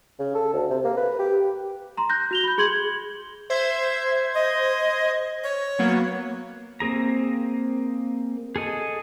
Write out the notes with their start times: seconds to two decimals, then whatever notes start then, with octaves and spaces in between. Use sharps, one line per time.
0.19 C#3
0.35 A4
0.53 D2
0.70 C3
0.85 A#3
0.97 B4
1.19 G4
1.97 A#5 C6
2.09 F#6 G6 A#6
2.31 F#4 F7 G7
2.44 B5 G6
2.58 G#4 C6 G#6 F#7
3.50 C5 E5 G#6
4.35 D#5
5.43 C#5
5.79 F#3 A#3 B3
6.80 A#3 C4 G#4 A#5
8.56 G#4 A4 D#5